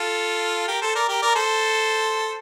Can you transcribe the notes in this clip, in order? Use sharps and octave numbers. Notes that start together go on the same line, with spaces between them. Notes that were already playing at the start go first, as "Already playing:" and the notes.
Already playing: F4 A4
G4 A#4
A4 C5
A#4 D5
G4 A#4
A#4 D5
A4 C5